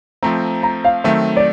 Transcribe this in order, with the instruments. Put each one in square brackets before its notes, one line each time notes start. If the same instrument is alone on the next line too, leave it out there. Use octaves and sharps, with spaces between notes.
[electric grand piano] F3 A3 C4 [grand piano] A#5
[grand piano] A#5
F5
[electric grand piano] D#3 F#3 A3 C4 [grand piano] E5
[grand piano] D5